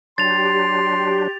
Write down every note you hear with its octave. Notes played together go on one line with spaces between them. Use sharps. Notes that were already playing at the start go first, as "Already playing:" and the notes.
F#3 D4 G4 C6 A6 F7